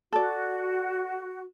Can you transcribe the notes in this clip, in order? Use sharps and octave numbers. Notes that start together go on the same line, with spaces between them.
F#4 A4 D5